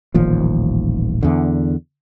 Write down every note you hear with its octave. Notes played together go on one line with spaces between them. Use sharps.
D#1 A1 D#2 F3
E2 D3